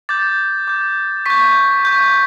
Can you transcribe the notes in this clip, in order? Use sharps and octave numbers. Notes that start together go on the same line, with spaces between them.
D6 G6 A6
D6 G6
C#6 G6 B6
C#6 G6